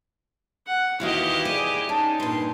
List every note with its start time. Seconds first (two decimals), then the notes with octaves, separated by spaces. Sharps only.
0.67 F#5
1.00 D#2 E3 E4 F#4 G4 D#5 F5
1.45 G#4 D5 D#7
1.89 C#4 D#4 A5
2.20 G2 A#2 C6